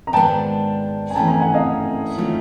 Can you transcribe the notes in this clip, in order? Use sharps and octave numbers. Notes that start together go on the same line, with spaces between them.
A#5
G#2 D#3 G#3 B3 D4 G5 A5
G#5
E3 A3 C#4 G5 A5
G#5 A#5
F#5 G#5
D#5 F5
D#3 F#3 A3 C#4 F4